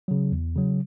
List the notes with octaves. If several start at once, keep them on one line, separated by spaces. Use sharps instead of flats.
C#3 F#3
E2
C#3 F#3